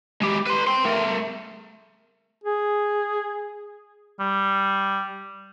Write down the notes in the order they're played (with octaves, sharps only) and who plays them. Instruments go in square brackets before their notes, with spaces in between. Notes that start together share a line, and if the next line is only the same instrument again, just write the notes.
[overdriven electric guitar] G#3 G4
B4 C6
G5 C6
A3 A#4
[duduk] G#4
[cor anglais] G3